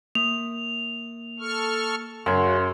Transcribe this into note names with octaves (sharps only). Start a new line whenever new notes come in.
A#3 F7
A4 C#6 F6
F#2 C#3 F#4 C6 G#6